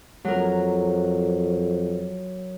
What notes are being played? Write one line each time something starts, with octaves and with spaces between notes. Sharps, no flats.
F2 F#3 A#4